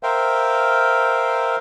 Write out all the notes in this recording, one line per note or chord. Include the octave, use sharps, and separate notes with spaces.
A#4 C5 E5 F5 G5